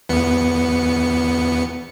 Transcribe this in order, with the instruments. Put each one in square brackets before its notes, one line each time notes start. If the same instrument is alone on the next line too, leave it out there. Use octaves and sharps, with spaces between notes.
[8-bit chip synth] E2 B3 C#7